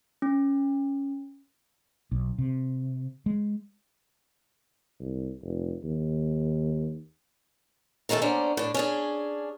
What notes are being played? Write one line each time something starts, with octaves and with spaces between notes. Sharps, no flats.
C#4
B1
C3
G#3
C2
F1
D#2
A#2 D#3 G#3 A3 A4
D3 A#3 C#4 D4 C5
A2 D4
C#4 D4 G#4